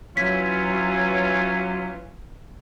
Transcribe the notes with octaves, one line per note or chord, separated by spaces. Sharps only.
E3 F#3 C#4 F4 B6